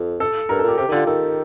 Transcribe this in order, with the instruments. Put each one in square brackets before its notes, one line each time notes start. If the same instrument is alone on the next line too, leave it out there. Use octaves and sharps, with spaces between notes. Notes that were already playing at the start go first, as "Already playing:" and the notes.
Already playing: [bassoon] F2
[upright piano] A4
[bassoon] G2 [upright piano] A#4
[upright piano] A4
[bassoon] A#2 [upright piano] G4
[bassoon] C3 [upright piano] G4
[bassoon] D#3
[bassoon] D3 [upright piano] F4
[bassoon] D#3 [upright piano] A4